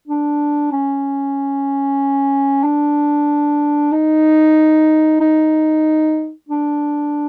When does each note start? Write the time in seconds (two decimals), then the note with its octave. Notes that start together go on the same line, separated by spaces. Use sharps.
0.08 D4
0.72 C#4
2.64 D4
3.92 D#4
5.20 D#4
6.49 D4